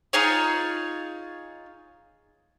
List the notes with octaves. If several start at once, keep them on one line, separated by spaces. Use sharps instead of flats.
D#4 F4 G#4 C#5